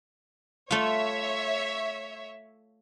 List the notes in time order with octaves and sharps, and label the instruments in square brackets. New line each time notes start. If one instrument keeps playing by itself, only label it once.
[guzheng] A3 F4 [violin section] C#5 E5